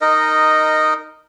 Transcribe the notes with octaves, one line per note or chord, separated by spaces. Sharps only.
D#4 A#4 D#5